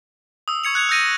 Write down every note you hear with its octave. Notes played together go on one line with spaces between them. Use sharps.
D#6 E6
C#6 G#6 C#7 F7
F#6 G#6 C#7 F7
E6 G6 A#6 D#7